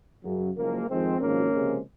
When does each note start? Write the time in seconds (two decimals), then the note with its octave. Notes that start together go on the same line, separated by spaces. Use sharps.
0.24 F#2 C#3 F#3
0.57 F#1 F#2 F3 G#3 A#3
0.89 F2 D#3 G#3 C4
1.21 G#1 F#2 F3 G#3 A#3 C#4
1.54 C#2 C3 F3 G#3